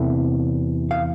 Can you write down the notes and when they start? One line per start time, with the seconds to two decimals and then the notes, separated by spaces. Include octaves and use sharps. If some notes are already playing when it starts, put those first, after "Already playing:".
Already playing: E2 C3 E3 A3
0.91 F5